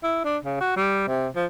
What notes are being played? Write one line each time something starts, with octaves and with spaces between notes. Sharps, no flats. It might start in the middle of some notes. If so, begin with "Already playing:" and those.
E4
D4
C#3
F#4
G3
C3
F3